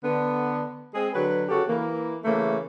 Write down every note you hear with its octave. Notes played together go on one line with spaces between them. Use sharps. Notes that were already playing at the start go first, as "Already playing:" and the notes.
D3 B3
G#3 C4 G#4
D3 F#3 B4
C#3 F#4 G4 A4
E3 A#3
C#3 E3 A3 A#3